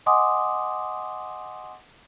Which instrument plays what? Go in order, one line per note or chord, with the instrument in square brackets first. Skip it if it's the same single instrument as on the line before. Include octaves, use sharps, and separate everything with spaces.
[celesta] D#5 F#5 G#5 C6 D6 D#6